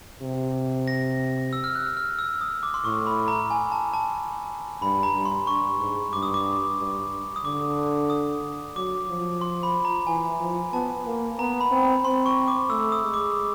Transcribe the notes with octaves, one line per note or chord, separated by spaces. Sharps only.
C3
A#6
E6
F6
F#6
F6
E6
D#6
D6
C6
A2 C#6
B5
A#5
G#5
A5
A5
G2 B5
A#5
G2
C6
G2 C#6
G#2
G2 D6
D#6
D6
G2
D#6
D3 D6
D#6
F#3 D6
F3
C6
B5
A#5
E3 G#5
F3
B3 A5
A#3
B3 A#5
B5
C4
C4 C6
C#6
D6
A3 E6
D#6
G#3
D6